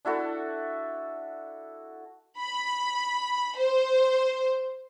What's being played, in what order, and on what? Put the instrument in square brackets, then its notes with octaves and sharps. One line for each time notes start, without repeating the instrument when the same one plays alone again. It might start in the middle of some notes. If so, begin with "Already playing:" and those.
[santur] D4 E4 F#4 A4
[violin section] B5
C5